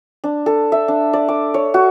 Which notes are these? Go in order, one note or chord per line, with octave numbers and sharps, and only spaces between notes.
D4
A4
E5
D4
D5
D6
C#5
F#4